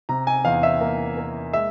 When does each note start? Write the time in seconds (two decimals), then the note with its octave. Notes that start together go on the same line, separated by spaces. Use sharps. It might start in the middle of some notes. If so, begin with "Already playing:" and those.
0.09 C3 A#5
0.27 G#5
0.45 E2 F5
0.63 E5
0.81 A#3
1.17 A#3
1.53 G#3 E5